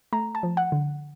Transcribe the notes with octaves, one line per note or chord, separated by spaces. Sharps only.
A3 A#5
A5
F3
F#5
D3